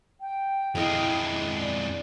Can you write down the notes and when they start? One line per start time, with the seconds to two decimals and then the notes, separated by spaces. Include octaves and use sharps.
0.21 G5
0.75 F2 G#3 E4 D#5 F5
1.58 D5